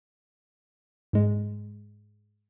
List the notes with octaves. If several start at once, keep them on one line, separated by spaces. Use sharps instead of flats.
G#2 G#3